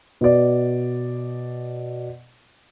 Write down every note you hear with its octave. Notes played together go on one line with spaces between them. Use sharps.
B2 D5